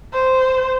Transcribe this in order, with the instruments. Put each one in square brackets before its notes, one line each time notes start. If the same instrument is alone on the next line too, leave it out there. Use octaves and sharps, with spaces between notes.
[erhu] C5